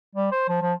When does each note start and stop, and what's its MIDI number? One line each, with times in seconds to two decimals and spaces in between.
0.15 0.30 55
0.32 0.46 72
0.49 0.60 53
0.62 0.73 53